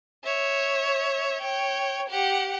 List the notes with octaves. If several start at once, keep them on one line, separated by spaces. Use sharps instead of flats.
C#5 E5
C#5 G5
G4 F#5